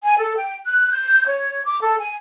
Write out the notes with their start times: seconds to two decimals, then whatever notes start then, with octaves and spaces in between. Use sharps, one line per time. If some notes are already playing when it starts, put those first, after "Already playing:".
0.03 G#5
0.18 A4
0.36 G5
0.65 F#6
0.91 G6
1.27 C#5
1.65 D6
1.82 A4
1.99 G#5